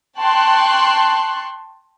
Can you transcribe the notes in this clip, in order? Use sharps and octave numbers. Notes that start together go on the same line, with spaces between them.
G5 A5 C6 C#6 F#6